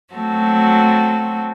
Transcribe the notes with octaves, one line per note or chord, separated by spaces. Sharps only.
F#3 A3 C4 F#4 A4